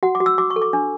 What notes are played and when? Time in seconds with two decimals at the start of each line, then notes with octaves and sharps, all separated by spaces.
0.03 F#4 F#5
0.15 D6
0.20 F#4
0.26 E6
0.38 F#4 D6
0.50 C#6
0.56 A4
0.62 D6
0.73 D4